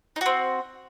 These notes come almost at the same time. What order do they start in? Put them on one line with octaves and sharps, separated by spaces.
D#4 F#4 C4